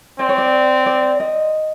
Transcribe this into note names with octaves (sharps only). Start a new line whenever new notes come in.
C4 D5
C#5
D5
D5
D#5